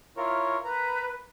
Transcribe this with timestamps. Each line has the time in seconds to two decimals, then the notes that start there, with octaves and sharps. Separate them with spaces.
0.17 E4 F4 A#4 C#5
0.64 A#4 B4 A#5